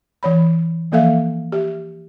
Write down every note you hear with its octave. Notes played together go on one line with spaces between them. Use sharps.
E3 C#5 B5
E3 F3 A#3 A4 E5 F5
G4 E5